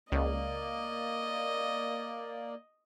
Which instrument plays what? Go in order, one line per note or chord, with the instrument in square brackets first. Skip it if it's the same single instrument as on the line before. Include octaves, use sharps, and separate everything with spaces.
[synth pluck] C#2 [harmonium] A#3 D5 [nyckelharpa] D#5